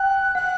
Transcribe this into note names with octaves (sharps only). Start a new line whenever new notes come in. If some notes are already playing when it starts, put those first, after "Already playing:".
Already playing: G5 F#6
F#5 F#6